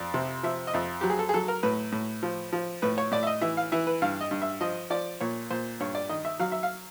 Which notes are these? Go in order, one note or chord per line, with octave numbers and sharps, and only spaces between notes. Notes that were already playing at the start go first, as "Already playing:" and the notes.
Already playing: F2 D5
C3
F3 E5
D#5
F2 E5
F#3 G4
G#4
A4
G#4
F#3 A4
A#4
A2 B4
A2
F3
F3
A2 B4
C#5
A2 D5
E5
D#5
E3 E5
F5
E3 E5
B4
G2 F5
D#5
G2
E5
F3 D#5
F3 D5
A#2 C#5
A#2 C5
G2 C#5
D5
D#3 D#5
E5
F#3 F5
E5
F5